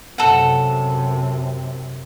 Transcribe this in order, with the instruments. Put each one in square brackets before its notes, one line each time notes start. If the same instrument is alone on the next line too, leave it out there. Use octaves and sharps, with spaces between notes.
[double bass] F#2 C3 [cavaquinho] A4 F#5